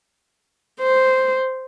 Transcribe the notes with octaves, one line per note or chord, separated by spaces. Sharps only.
C5